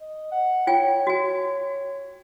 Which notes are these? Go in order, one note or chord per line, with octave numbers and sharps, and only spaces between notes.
D#5
F#5
F4 C#5 G5 G#5
F#4 G#5